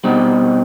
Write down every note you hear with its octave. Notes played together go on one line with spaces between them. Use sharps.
B2 G3 C4 D#4